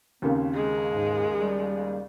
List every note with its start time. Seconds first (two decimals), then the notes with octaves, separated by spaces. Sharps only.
0.22 D#2 C#3 A#3 C4
0.54 G#3
0.92 G#2
1.40 G3